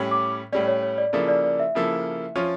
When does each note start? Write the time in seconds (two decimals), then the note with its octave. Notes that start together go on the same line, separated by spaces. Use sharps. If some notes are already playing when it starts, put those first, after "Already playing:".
Already playing: A2 G3 C#4
0.11 D6
0.52 A2 G3 C#4 D5
0.67 C#5
0.83 C#5
0.98 D5
1.13 C#3 F3 A#3 E4 A4 D5
1.28 D5
1.44 D5
1.60 E5
1.75 C#3 F3 A#3 E4 A4
2.36 F3 C#4 F4 C#5